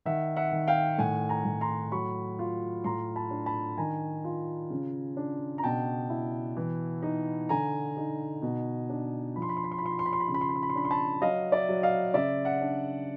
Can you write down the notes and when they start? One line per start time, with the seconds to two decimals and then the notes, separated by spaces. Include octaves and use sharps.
0.05 D#3 E5 F#5
0.36 E5 F#5
0.52 D#3
0.67 F5 G5
0.99 A2 F#5 G#5
1.29 G#5 A#5
1.45 A2
1.61 A#5 C6
1.92 F#3 B5 C#6
2.39 F4
2.84 A2 A#5 C6
3.16 A5 B5
3.31 D4
3.46 A5 B5
3.78 D#3 G#5 A#5
4.24 F4
4.70 C#3
5.17 D4
5.58 A#5
5.63 B2 G5 A5
6.10 E4
6.57 E3
7.03 D#4
7.49 D3 G#5 A#5
7.97 D#4
8.42 B2
8.90 D4
9.36 F3 B5
9.42 C6
9.49 B5
9.57 C6
9.64 B5
9.72 C6
9.78 B5
9.82 F4 C6
9.92 B5
9.99 C6
10.06 B5
10.13 C6
10.20 B5
10.28 C#3 C6
10.34 B5
10.41 C6
10.49 B5
10.56 C6
10.63 B5
10.70 C6
10.75 D4 B5
10.85 C6
10.91 A5 B5
11.21 F#3 D#5 F5
11.52 D5 E5
11.69 F#3
11.83 D#5 F5
12.14 C#3 D5 E5
12.45 E5 F#5
12.61 D4